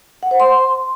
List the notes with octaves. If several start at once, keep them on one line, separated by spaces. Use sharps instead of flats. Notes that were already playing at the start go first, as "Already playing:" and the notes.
F#5
C5
C6